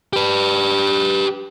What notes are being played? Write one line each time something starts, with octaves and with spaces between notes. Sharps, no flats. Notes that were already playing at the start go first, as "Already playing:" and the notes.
G4 B4